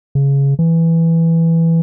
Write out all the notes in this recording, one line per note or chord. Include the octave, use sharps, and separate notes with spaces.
C#3
E3